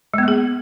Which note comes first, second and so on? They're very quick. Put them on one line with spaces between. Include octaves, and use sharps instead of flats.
G#3 B3 A#3 G#4